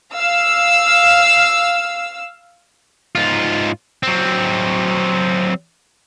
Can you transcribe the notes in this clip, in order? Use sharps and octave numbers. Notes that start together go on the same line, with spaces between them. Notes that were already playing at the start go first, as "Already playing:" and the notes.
F5 E6
G#2 F4
F#3 C4